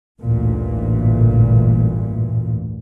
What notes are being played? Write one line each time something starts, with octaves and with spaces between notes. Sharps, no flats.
A1 D2 G2 A#2 E3